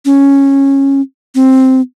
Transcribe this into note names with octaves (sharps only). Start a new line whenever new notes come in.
C#4
C4